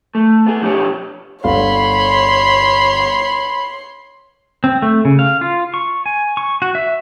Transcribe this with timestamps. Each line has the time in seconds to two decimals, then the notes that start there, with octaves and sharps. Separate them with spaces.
0.15 A3
0.46 B3 G#4
0.62 B2 F3 D4 F#4 G4 C#5
1.44 G1 D3 C#5 F5 B5 C6
4.64 C4
4.82 A3
5.05 C#3
5.19 F5
5.41 F4
5.74 C#6
6.06 G#5
6.37 C#6
6.62 F#4
6.75 E5